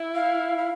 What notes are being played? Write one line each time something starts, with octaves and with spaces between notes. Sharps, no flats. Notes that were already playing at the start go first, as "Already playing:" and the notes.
Already playing: E4
F5
F5